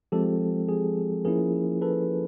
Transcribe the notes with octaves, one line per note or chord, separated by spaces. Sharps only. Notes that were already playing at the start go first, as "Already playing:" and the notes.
F3 G#3 C4 G4 A4
G#4
F3 A#3 C#4 E4 G#4 A#4
A4 B4